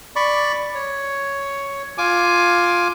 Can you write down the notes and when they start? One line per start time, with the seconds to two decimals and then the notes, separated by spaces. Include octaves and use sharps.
0.16 D5 B5 C#6
0.75 C#5
1.98 F4 G#5 D6